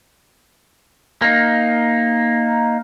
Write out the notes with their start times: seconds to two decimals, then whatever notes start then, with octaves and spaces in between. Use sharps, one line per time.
1.22 A#3 D#4